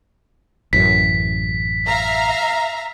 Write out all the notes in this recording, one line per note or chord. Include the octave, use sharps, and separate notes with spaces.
A1 F#2 B6
E5 F5 A#5